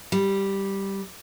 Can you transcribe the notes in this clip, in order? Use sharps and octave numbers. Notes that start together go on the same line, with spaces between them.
G3